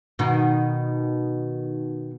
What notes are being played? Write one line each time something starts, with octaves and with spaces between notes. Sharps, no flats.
B2 D#3